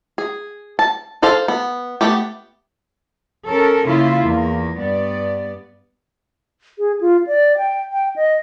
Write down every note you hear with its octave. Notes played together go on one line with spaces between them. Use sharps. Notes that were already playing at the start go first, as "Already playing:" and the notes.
G#4
A5
G#4 A4 C5 F5 A5
B3
A3 B3 G4
C#4 A4 A#4
C#3 A#3 E4 F4
E2 A#3
G2 B3 D5
G#4
F4
D5
G5
G5
D#5